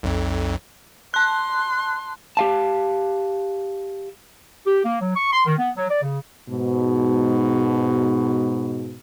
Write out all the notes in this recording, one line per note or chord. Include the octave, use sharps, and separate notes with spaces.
B1 F2
A5 C6 F#6
G4 F5 A5
G4
A#3
F#3
C#6
C6
D#3
B3
F#3
D5
C#3
G#2 B2